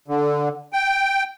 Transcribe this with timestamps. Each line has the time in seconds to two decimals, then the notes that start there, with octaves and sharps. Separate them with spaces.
0.08 D3
0.73 G5